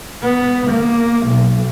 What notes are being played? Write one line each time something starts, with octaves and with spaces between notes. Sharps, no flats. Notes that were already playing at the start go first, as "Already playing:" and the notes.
B3
A#3
B1